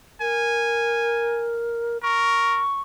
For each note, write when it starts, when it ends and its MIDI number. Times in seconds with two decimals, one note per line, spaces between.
0.21 1.98 70
0.21 1.55 80
2.03 2.63 70
2.03 2.81 85